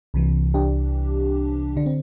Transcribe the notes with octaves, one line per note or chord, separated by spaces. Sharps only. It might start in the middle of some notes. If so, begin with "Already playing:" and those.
C2 C3 E3
D4 G4
D3 D4
C4